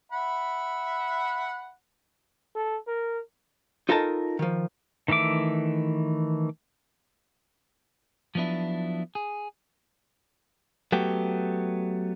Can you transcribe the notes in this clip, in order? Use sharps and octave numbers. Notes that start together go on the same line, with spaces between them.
E5 F#5 B5
A4
A#4
D#4 F4 A4 A#4 D#5 A5
D#3 F3
D#3 E3 A3 E5 D6
F3 F#3 B3 D4 E4
G#4
F#3 A3 B3 G4